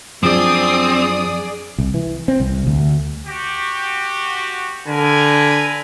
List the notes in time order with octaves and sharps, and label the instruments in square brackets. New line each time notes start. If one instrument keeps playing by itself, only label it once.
[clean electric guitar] F#2 F3 D4 [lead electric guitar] C4 [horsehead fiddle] G#4 D5 [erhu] D#6
[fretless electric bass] C2
E3
C4
C2
D2
[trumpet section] F#4 G4
[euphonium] D3 [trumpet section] A#4 B4 G#5